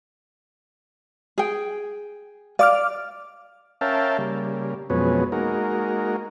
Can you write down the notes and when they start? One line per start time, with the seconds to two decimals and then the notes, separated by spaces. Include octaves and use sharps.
1.38 G#4 G5
2.59 D5 F5 D6 F6
3.81 C#4 A#4 E5 F5 G5 A5
4.18 C#3 G3 A#3
4.90 F2 B2 F#3 G#3 B3 C#4
5.32 G#3 A#3 D#4 F#4 A#4